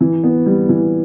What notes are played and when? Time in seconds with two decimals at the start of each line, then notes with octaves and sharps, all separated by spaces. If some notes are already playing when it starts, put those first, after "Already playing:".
0.01 E3
0.24 B3
0.46 G3
0.69 E3